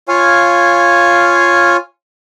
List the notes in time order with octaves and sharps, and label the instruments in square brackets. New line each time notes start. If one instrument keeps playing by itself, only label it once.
[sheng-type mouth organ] F4 C#5 F5 G#5